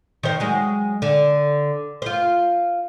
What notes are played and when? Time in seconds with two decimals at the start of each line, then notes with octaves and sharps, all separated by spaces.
0.23 D#3 C5
0.40 F#3 G#3
1.02 D3
2.02 F4 C5